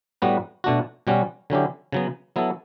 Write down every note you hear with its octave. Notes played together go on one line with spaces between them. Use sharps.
A2 G3 B3 F#4 B4
B2 A3 D4 F#4
B2 G3 C#4 F#4
D3 F#3 C#4 E4 G4
C#3 F#3 B3
F#3 B3 E4 A4